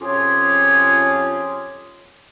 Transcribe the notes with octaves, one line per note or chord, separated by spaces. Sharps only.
F2 C#4 F4 G4 G#4 C#5